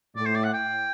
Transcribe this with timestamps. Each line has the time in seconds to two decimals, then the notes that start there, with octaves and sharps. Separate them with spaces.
0.16 A2 D5
0.25 C5
0.35 D5
0.44 F#5
0.54 G5